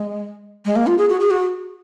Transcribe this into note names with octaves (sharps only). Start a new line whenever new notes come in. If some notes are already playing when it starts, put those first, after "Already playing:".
Already playing: G#3
G#3
A#3
F4
G#4
F#4
G#4
F#4